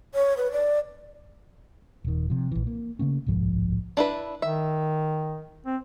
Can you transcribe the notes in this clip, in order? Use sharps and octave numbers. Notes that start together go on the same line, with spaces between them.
C#5
B4
D5
D#1 D#3
C3 F3
A#1 E3
A#3
C#3 A3 A#3 C#4
D1 B1 G#2 F3
D4 E4 B4
D#3 E5
C4